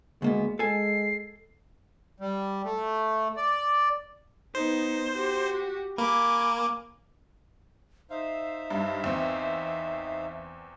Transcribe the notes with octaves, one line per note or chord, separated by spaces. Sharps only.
D2 G#3 A#3 B3
G#3 A4 G#5 C7
G3
A3
D5
B3 D#4 C5
F#4 G4
A#3 G#5 B5 D6
D#4 C5 E5 F5
G2
E2 C4